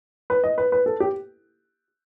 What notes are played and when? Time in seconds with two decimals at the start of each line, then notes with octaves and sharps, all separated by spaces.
0.30 B4
0.44 D#5
0.58 B4
0.72 B4
0.86 A4
1.00 G4